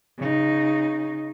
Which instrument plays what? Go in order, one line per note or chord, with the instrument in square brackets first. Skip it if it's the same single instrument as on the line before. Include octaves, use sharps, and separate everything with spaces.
[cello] C#3 D#4